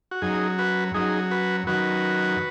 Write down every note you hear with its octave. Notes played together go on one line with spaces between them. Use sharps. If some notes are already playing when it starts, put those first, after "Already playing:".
F#4
F#2 F#3 D#4 G#4
F#4 B4
F#2 F#3 D#4 G#4
F#4 B4
F#2 D#3 F#3 F#4 B4